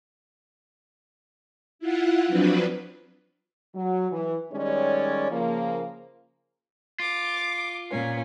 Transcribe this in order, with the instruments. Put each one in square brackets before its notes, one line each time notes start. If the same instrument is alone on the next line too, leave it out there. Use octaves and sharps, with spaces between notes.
[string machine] E4 F4 F#5
F3 F#3 C4 D4 B4
[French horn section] F#3
E3
D#3 G3 G#3 C#4 C#5 D5
C#3 F3 A#3
[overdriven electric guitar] F4 [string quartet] D6
[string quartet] A#2 C#4